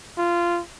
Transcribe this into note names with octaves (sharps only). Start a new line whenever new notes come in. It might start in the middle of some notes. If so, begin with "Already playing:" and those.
F4